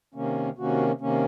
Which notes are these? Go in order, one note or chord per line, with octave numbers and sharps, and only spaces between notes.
C3 D#3 A#3 C#4
C3 D#3 A#3 C#4 F#4
C3 D#3 A#3 C#4